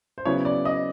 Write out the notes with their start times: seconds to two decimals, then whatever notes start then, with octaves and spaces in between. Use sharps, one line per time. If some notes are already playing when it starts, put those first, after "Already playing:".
0.18 C5
0.25 C#3 F#3 B3 E4 C#5
0.45 D5
0.65 D#5